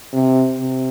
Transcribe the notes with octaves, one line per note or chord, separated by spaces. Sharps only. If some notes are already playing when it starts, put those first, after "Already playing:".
C3
C3